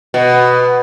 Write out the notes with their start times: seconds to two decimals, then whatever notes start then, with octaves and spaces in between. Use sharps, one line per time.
0.14 B2